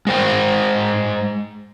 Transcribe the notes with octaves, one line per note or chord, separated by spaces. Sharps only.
G#3 C5 G5